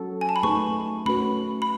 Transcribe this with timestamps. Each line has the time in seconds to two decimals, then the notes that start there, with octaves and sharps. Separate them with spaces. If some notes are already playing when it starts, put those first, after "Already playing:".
Already playing: F#3 C#4 F#4 A4
0.21 G#5
0.29 A5
0.36 B5
0.43 A3 D#4 G#4 B4 C#6
1.06 A3 C#4 F#4 B4 B5
1.62 B5